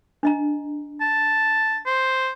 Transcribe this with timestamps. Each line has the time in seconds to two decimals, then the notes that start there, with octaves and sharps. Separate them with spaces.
0.23 D4 D#5 A#5
1.01 A5
1.86 C5